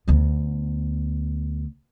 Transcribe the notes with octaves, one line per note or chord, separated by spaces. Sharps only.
D2 B3